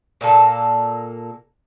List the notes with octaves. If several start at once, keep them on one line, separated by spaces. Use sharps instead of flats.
A#2 A#3 A4